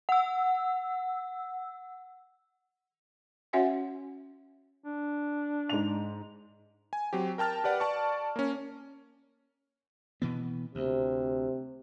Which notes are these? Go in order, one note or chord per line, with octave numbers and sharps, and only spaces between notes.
F#5 E6
C#4 F#4 C#5 E5 F#5 G#5
D4
G#2 F7
G#5
F#3 C4 G4
A#4 G5 A5 F6 A6
G4 B4 D5 F#5
D5 A5 C#6
A#3 C#4
B2 E3 B3
D2 C3